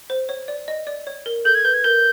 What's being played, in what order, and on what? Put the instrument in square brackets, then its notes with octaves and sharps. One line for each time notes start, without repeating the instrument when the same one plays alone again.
[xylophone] C5
C#5
D5
D#5
D5
C#5
A#4
[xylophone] A4 [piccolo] G6
[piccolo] G#6
[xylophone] B4 [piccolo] G6
[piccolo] G#6
[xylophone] A#4 [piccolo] G6